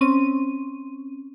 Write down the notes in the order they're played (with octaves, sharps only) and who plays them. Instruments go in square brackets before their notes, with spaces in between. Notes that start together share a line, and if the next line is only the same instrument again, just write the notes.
[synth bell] C4 C#4 D#7